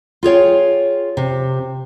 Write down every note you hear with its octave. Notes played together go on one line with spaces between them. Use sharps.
F4 G#4 C#5 G5
C3